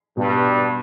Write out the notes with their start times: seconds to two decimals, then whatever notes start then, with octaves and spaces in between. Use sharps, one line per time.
0.17 G2 B2